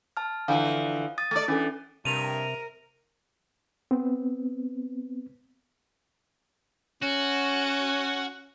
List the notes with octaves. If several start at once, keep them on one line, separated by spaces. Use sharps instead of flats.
A5 F6
D3 E3 F3 F5
D#6 A6
A3 D5 A6
E3 C#4 D4 A4
G2 C3 A#4 D#7 F7
B3 C4
C#4 F#4